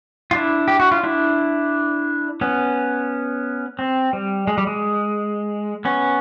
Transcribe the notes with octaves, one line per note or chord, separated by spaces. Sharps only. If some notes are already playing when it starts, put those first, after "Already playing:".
F4
D4 E4
G4
F#4
F4
D4 E4
B3 C#4
C4
G3
G#3
G3
G#3
B3 C#4